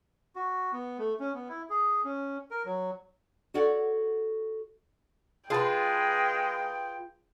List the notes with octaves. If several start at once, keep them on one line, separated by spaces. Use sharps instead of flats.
F#4
B3
A3
C#4
B3
E4
G#4
C#4
A#4
F#3
F#4 A4 C#5 D5 F#5
G#3 F4 G#4 B4 G5 A5